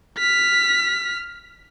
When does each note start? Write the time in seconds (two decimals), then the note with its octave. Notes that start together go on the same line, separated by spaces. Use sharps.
0.18 F6 B6